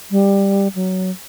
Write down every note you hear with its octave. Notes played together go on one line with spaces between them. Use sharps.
G3
F#3